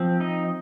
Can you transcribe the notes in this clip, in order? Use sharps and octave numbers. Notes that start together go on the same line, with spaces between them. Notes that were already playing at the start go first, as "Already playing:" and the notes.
Already playing: F3 C4
D#4 D#5